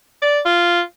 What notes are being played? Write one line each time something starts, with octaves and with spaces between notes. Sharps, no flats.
D5
F4